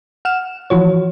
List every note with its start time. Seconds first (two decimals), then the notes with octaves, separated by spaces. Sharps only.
0.25 F#5 F6 E7
0.70 E3 F3 F#4 C#5